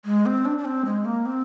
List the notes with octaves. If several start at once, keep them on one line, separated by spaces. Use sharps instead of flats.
G#3
C4
D4
D4
C4
G#3
A#3
C4